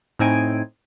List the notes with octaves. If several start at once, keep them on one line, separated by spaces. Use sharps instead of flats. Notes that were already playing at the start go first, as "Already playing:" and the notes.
A2 C4 D#4 G#5 D7